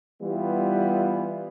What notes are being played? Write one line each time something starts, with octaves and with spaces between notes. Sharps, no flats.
E3 G3 B3 E4 F4